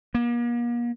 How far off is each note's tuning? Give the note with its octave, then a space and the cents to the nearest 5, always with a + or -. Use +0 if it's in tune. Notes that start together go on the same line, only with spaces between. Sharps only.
A#3 +40